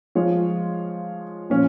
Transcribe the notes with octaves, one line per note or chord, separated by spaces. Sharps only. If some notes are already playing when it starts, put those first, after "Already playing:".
F3 G#3 F4 C#5
A#2 F3 C#4